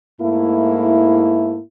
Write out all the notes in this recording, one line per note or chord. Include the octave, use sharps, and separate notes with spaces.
G#2 A3 A#3 E4